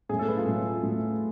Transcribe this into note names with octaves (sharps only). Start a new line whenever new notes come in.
A2 F#3 A3 G#4
A4
B4
F4
A2 F#3 A3
A2 F#3 A3